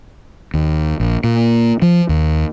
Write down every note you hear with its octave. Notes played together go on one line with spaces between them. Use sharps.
D#2
A#1
A#2
F3
D#2